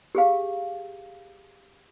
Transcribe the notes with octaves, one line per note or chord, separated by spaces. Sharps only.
G4 G#4 F5